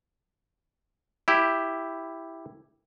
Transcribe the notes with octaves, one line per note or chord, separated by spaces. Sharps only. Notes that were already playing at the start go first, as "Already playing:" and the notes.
E4 G4